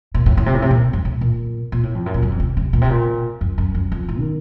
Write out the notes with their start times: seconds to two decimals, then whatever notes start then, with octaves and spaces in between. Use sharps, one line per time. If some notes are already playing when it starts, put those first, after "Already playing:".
0.14 A#2
0.26 A2
0.37 A2
0.46 C3
0.54 A2
0.62 C3
0.71 A#2
0.93 F#2
1.05 A2
1.21 A#2
1.72 A#2
1.83 A2
1.95 F2
2.06 F#2
2.14 A#2
2.22 F#2
2.31 F2
2.40 C3
2.57 C3
2.73 A#2
2.81 C3
2.89 A#2
3.41 F#2
3.58 F#2
3.75 F#2
3.92 F2
4.09 A2
4.20 D#3